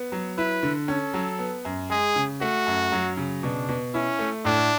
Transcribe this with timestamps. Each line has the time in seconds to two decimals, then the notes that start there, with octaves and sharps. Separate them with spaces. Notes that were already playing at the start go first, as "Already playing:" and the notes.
Already playing: B3
0.12 F#3
0.37 E4 B4
0.63 D3
0.88 C#4 A4
1.14 F#3
1.39 B3
1.65 F#2
1.90 G#3 G#4
2.16 C#3
2.41 A3 F#4
2.67 F#2
2.92 F#3
3.17 C#3
3.43 B2 D4
3.69 B2
3.94 C#4 E4
4.19 A3
4.45 A2 D4